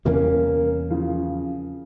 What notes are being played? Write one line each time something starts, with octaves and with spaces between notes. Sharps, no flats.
E2 C3 E3 G3 A#3 C#4
C#3 F3